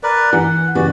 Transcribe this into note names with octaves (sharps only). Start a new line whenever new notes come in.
A#4 B4 D5
E3 F#5
C#3 E3 F#4 B4 D5